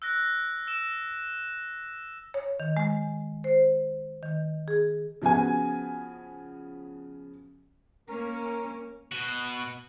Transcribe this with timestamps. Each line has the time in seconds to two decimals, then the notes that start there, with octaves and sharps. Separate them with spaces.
0.02 E6 F#6 A#6
0.67 E6 E7
2.34 C#5
2.60 D#3
2.77 G#3
3.44 C5
4.23 D#3
4.68 G#4
5.22 C#3 F3 B3 F#4 G#5
8.09 A#3 C#4 A#4
9.12 B2 F#4